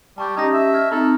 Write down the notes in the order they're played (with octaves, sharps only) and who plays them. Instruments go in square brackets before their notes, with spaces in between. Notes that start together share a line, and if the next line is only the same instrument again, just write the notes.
[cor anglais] G3 [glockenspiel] A5 C#6 G6
[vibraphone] C#4 G4 D#5 [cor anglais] D#4 [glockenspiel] G#6 A#6
[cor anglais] E5
[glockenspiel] F6 G#6
[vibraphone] C4 D#4 [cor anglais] A4 [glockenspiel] A#5